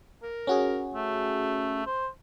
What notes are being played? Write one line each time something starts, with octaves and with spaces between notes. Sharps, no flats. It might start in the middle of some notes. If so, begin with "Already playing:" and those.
A#4
C#4 F#4 G#4
A3
C5